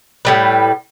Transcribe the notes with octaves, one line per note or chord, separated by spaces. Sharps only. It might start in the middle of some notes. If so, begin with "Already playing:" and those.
A2 G3 B4